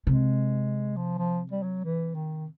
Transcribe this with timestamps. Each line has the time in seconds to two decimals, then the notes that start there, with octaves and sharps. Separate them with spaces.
0.07 C3 G#3
0.96 F3
1.18 F3
1.51 G3
1.63 F#3
1.84 E3
2.15 D#3